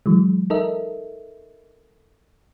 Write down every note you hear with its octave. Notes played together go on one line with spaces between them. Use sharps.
E3 F#3 G#3
D#4 A4 A#4 D#5 E5